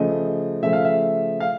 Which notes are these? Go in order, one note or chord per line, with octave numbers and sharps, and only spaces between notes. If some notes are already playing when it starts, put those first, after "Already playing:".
Already playing: C#3 F3 A3 D#5
C#3 F3 A3 E5
F5
E5
F5